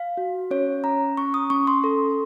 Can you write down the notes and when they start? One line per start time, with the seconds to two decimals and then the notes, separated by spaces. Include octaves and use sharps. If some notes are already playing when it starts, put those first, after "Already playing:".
Already playing: F5
0.17 F#4
0.51 C#4 C#5
0.84 C#4 A#5
1.17 C#4 C#6
1.34 D#6
1.50 C#4 C#6
1.67 C6
1.84 A4